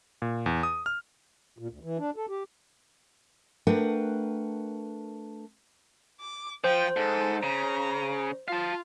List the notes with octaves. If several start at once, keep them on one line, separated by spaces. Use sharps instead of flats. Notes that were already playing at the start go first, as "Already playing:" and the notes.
A#2
E2
D#6
F6
A#2
D2
E3
D4
A4
G4
A3 D4 A#4 B4 F#5 G5
D6
F3 C5 G5
G#2 A4
C#3 A#5
F4 F5 A5